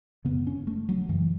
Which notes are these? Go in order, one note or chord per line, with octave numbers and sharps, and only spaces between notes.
F#2 C#3 B3
C#4
A3
F#3
F#2 C#3 E3